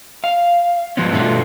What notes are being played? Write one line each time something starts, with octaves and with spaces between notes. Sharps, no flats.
F5
F3 B3 C#4
G2 B2 A3 B3 D4 F4